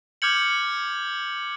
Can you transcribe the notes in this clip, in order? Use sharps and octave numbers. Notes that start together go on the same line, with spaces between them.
D6 F6 G6 G#6 C#7 F#7